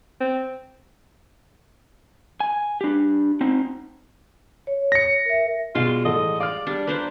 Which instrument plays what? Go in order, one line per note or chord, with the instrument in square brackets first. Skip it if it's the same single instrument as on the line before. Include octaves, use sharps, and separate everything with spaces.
[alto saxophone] C4
[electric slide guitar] G#5
D4 G4
C4 D#4
[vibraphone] C#5
[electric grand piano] A#6 C#7
[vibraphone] A#4 E5
[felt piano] B2 [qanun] G3 G#3 [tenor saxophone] F4
[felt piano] A1 A4 [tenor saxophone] D#5
[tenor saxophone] D5 [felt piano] F5 F6
[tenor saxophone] G3 [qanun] D4
[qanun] A#3 D4 C5 [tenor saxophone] B4